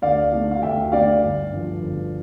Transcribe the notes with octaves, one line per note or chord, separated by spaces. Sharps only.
D2 D5 F5
D3 A3
F5
D2 E5 G5
D3 A3 D5 F5
G1
G2 F3
G1